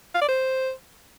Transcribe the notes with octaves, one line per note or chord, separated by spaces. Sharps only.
F5
D5
C5